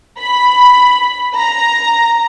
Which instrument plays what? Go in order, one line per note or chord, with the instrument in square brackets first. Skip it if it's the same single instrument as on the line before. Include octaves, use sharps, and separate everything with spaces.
[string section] B5
A#5